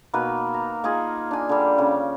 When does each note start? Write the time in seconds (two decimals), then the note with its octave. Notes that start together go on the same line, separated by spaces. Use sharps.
0.14 B2 A#3 D#4 B4
0.54 A#5
0.84 A#3 D#4 F4 G#4
1.31 D4 G#5
1.49 D3 G3
1.78 C#3